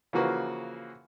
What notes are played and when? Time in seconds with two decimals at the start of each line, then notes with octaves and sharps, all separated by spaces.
0.13 C#3 E3 F3 A#3 F#4 B4